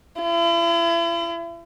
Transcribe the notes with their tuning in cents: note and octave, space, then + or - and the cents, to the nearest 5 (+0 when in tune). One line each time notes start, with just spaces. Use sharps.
E4 +40